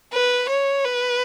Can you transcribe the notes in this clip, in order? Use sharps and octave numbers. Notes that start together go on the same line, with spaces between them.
B4
C#5
B4